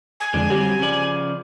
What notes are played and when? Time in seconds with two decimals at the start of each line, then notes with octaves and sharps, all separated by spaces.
0.20 G#5
0.34 F2 D3 G#3 D4
0.50 F#3 G3 C4 G4
0.80 C#3 F3 D5